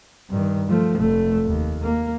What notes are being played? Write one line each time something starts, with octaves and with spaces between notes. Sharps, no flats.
G2 D#3
F3 A3
F1 A3
D#2
A#3